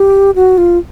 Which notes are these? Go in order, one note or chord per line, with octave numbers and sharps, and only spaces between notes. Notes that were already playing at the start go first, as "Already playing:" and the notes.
Already playing: G4
F#4
F4